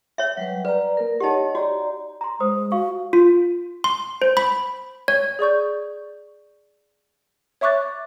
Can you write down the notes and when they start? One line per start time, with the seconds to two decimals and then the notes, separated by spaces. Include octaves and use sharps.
0.18 C#5 E5
0.37 F#3 G3 B4
0.65 B4 D5 A#5
0.97 A#3 A#4
1.20 D#4 G4 C#5 D#5 F#5
1.55 F#4 G4 D5 A#5
2.21 A#5 C6
2.40 G#3 C5 D#6
2.72 F#4 F5 C#6
3.13 F4
3.84 C6
4.22 C5
4.37 B5
5.08 C#5
5.39 G#4 D5 C#6 G6
7.61 C#5 E5 C#6 D6 F#6 A6